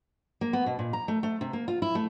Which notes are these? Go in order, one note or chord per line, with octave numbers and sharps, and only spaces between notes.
A#3
B3
B2
A#2
A#5
A3
A3
C3
A#3
F4
E4
A3